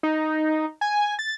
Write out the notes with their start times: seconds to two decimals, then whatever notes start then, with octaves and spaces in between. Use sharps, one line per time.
0.03 D#4
0.81 G#5
1.19 A6